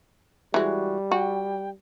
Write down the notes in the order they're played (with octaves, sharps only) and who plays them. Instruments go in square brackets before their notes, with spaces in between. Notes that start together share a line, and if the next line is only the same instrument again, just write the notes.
[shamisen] E3 G#3 [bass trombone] G3 [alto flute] F#4
[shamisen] F#4 [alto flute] G5